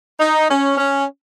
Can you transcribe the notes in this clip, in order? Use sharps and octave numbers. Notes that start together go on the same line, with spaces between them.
D#4
C#4
C#4